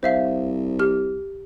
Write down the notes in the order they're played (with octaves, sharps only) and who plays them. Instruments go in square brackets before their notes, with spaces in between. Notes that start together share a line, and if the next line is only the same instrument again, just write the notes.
[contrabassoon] C2 [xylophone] C5 E5 F5
[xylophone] G4 F6